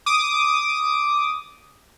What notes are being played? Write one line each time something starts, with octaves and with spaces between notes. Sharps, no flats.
D6 D#6